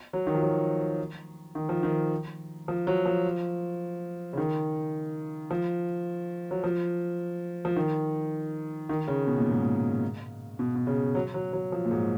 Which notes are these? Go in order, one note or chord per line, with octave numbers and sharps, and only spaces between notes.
F#3
D#3
F3
F#3
D#3
F3
D#3
F3
F#3
F3
C#3
D#3
F3
F#3
F3
F3
D#3
D#3
C#3
B2
A#2
G#2
A#2
B2
B2
C#3
F#3
F#3
F#3
F3
A#2
G#2